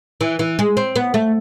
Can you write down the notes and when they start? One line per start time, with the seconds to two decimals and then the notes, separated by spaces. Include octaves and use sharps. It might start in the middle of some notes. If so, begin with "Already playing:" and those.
0.21 E3
0.39 E3
0.59 G#3
0.77 C4
0.96 B3
1.14 A3